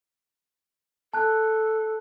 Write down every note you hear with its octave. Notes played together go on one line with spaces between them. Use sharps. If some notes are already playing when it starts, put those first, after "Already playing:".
A4 A5 F#6